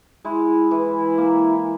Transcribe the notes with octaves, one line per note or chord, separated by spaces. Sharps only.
G#3 E4
E3
A#3